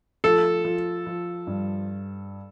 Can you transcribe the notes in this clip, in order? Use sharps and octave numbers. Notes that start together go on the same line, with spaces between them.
F3 A4
F3
F3
G2